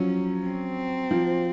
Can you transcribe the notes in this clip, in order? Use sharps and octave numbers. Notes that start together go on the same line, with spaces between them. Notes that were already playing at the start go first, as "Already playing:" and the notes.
Already playing: F3 F#3 C#4
C4
F3